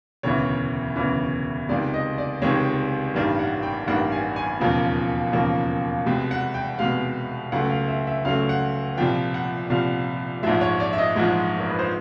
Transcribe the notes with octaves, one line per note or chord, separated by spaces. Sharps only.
E1 D2 C#3 E3 C#5
E1 D2 C#3 E3
C#2 C3 D#3 G#3 D5
D#5
D5
C#2 C3 D#3 G#3 C#5
A1 G2 D#3 G3 A#3
F#5
G5
A1 G2 D#3 G3 A#3 F#5
G#5
G#5
E1 D#2 C#3 F3 A#3
E1 D#2 C#3 F3 A#3
C2 B2 G#3 G5
F#5
G5
C2 B2 G#3 F5
C#2 C#3 F#3 A3 F#5
F5
E5
E5
C#2 C#3 F#3 A3 F5
F#5
C2 A#2 F3 G5
F#5
C2 A#2 F3 F5
A#1 G#2 F3 G#3 E5
C#5
D5
E5
D#5
A#1 G#2 F3 G#3
A#4
B4
C5